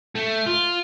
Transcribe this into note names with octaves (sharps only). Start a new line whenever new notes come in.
A3
F4